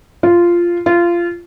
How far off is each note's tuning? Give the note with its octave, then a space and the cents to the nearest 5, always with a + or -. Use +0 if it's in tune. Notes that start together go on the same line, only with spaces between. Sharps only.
F4 -10
F4 -20